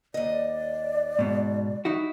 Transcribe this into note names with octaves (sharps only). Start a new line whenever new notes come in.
D#2 D5 D#5
G#2 B2
D#4 E4 F#4